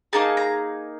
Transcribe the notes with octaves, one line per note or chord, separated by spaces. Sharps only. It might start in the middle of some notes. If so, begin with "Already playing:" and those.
A#3 D#4 G#4 A5
A#5